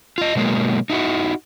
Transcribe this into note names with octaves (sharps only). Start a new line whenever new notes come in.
F4 D#5
B2 F#3 G#3 A#3
D#4 E4 F#4